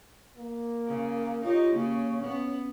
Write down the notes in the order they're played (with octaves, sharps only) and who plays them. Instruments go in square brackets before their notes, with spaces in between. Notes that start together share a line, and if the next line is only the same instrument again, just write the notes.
[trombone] A#3
[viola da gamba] C#3
[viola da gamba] D#4 G4 [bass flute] F4 [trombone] C#5
[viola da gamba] C#3 [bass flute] A#3
[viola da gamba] B3 [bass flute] C#4